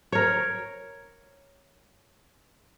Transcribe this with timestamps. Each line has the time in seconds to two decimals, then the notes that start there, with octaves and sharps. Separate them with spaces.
0.12 A#4 C#5